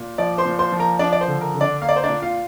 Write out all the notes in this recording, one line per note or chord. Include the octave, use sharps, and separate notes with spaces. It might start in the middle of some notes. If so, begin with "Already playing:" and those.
Already playing: A#2
F3 D5 D6
C5 C6
A#2
C5 C6
F3
A#4 A#5
F3 D4 D5
D5
C5
D3
A#4
D3
D4 D5
A#3 F5
D5
C5
D4 D5
A#2
F4 F5